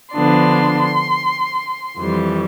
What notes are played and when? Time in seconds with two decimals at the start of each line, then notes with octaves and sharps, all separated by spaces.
0.14 D3 F3 B3 D4 C6
1.98 F2 E3 G3